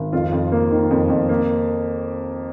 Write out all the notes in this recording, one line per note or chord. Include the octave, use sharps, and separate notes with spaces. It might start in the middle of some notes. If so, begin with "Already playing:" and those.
Already playing: G#1
F2 F4
F2
A#3
D#3
F2
F2
A#3